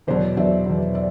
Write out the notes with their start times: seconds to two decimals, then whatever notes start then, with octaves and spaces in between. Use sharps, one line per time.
0.07 E2 B2 F#3 C5 D5
0.37 E2 B2 F#3 D5 E5
0.66 E2 B2 F#3
0.95 D5 E5